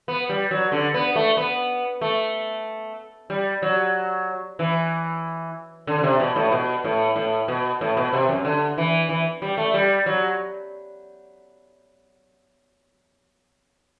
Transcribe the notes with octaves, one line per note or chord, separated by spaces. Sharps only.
B3
G3
F#3
D3
B3
A3
B3
A3
G3
F#3
E3
D3
D3
C3
B2
A2
B2
A2
A2
B2
A2
B2
C3
F#2
D3
E3
E3
G3
A3
G3
F#3